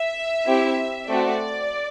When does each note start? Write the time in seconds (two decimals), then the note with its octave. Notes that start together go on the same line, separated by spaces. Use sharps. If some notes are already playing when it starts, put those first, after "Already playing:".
Already playing: E5
0.46 C4 E4 G4
1.08 A3 C4 F#4 D5